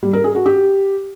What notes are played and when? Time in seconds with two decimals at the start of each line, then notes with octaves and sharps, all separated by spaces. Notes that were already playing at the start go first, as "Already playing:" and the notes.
0.03 G3
0.13 A#4
0.24 G#4
0.35 F#4
0.46 G4